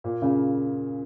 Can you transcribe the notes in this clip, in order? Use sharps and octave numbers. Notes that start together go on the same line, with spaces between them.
A#2
A#2 C#3